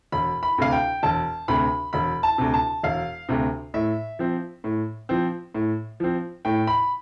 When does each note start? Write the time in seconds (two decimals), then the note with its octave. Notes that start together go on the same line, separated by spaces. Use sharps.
0.12 E1 B5
0.43 B5
0.58 D2 C3 F5
0.73 G5
1.03 E1 A5
1.48 D2 C3 B5
1.93 E1 B5
2.23 A5
2.38 D2 C3
2.54 A5
2.83 E1 F5
3.29 D2 C3
3.74 A2 E5
4.19 F3 C4
4.64 A2
5.09 F3 C4
5.54 A2
6.00 F3 C4
6.45 A2 G5
6.67 B5